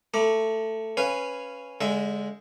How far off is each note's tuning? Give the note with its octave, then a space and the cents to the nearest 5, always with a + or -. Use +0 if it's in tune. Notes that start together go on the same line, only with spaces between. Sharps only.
A3 +10 A#5 +35 D6 +0
C#4 -5 B4 +0 F5 -10
D3 -35 G#3 +0 E5 +0